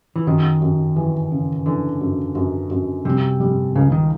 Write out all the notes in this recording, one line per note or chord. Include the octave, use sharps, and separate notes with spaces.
E3
F#2 D#3
F#2
E3
C#3
D3 E3
F#2
F#2
F#2
C3 G3
G3
C#2 C#3
D#3